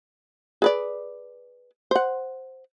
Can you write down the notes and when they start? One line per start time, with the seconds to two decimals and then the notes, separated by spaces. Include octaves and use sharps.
0.62 G#4 B4 D5
1.91 C5 F#5